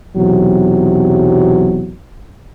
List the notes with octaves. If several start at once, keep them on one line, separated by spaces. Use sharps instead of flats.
B1 E2 C3 F#3